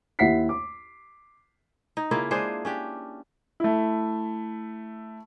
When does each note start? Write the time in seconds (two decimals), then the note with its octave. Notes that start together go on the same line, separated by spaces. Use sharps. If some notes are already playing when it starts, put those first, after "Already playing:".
0.19 D#2 E4 E5 F#5 B6 C7
0.49 D6
1.97 D#4
2.11 C#3 A#3 E4 F4
2.31 G#3 D4 G#4 C5
2.65 C#4 D4 G4
3.60 A3 E4